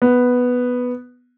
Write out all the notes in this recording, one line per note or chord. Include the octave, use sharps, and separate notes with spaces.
B3